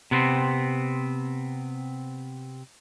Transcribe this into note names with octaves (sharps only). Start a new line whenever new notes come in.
C3 B3 C4